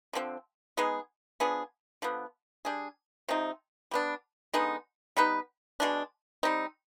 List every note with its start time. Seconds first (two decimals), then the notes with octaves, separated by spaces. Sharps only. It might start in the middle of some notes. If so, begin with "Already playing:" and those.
0.13 D3 F3 C4
0.77 G#3 B3 D#4 G#4
1.40 F3 B3 D4 G#4
2.02 D3 F3 B3
2.65 G3 D4 G#4
3.28 C3 F3 C4 D#4
3.91 G3 B3 D4
4.54 D3 G#3 B3 D#4
5.17 G3 B3 D#4 B4
5.80 B2 G#3 D4
6.43 G3 C4 D#4